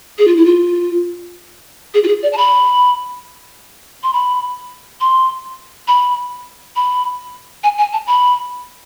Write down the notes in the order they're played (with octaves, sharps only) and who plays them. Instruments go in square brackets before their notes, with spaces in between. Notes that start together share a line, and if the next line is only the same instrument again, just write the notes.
[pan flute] G#4
F4
E4
F4
G#4
F4
G#4
D5
A5
B5
C6
B5
C6
B5
B5
G#5
G#5
A5
B5